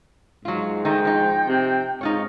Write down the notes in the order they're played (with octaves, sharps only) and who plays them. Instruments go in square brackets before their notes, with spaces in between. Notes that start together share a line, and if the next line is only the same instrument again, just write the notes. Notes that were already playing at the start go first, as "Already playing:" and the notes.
[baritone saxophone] G#2 [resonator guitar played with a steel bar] F#3 F4
[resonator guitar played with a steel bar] D#3 A3 D#4 [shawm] G5
[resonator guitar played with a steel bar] F3 D#4
[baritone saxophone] C3
[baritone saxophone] G#2 [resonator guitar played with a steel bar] D#4 F4 C#5